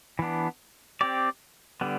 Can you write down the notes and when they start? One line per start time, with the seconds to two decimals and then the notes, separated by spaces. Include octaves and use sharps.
0.19 E3 B3 D4
1.01 C4 G4 D5
1.81 D3 G3 B3